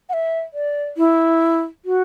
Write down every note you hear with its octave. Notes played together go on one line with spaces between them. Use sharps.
F#5
E5
D5
E4
F#4